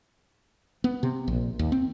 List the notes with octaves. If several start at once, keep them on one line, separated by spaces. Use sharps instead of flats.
B3
C3
A#1
D#2
C4